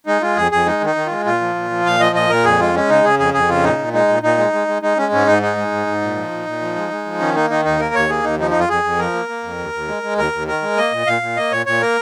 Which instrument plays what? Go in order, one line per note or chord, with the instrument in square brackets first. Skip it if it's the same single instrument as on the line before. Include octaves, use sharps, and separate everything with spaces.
[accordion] G#3 D#4
G#3 F4
F2 G#4
F2 G#4
G#3 D#4
D#3 D#4
D#3
G#3 F4
A#2 F4
F3
A#2
F3
A#2 F5
F3 D#5
A#2 D#5
A#2 A#4
F2 G#4
G#3 F4
G#3 C#4
C#3 D#4
C#3 G#4
F2 G#4
F2 G#4
C#3 F4
A#2 D#4
A#2
G#3 D#4
A#2
A#2 D#4
G#3
G#3
G#3
G#3 D#4
G#3 C#4
G#2 C#4
G#2 D#4
G#3 D#4
G#3
G#2
G#2
A#2
F3
A#2
A#2
F3
G#3
G#3
F3
D#3 C#4
A#3 D#4
D#3 D#4
D#2 D#4
A#3 A#4
D#2 C#5
A#3 G#4
D#2 D#4
F3 D#4
F2 D#4
F4
F2 G#4
F2
F3 A#4
A#3
A#3
F2
D#2
D#2
G#3
G#3
D#2 A#4
D#2
D#3 A#4
G#3
A#3 D#5
A#2
A#2 F5
A#2
A#3 D#5
A#2 C#5
A#2 C#5
A#3 A#4